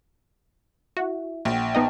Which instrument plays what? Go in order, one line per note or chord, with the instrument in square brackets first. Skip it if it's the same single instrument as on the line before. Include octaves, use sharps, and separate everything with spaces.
[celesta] E4 E5 [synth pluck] F#4
[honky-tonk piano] A#1 [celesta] F#5 G5
[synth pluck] B3 D#4 D#5 [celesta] G5 A5